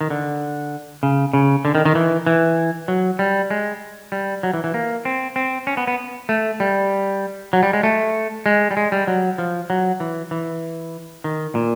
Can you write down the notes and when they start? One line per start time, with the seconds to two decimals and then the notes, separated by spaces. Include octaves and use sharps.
0.01 D#3
0.10 D3
1.03 C#3
1.33 C#3
1.65 D3
1.75 D#3
1.86 D#3
1.95 E3
2.26 E3
2.88 F#3
3.19 G3
3.51 G#3
4.12 G3
4.43 F#3
4.54 E3
4.64 E3
4.74 A#3
5.05 C4
5.36 C4
5.67 C#4
5.77 B3
5.88 B3
6.29 A3
6.60 G3
7.53 F#3
7.63 G3
7.73 G#3
7.83 A3
8.46 G#3
8.71 G3
8.77 G#3
8.92 G3
9.08 F#3
9.38 F3
9.70 F#3
10.00 E3
10.31 E3
11.24 D#3
11.55 A#2